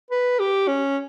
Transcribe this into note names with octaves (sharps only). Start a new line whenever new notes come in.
B4
G4
C#4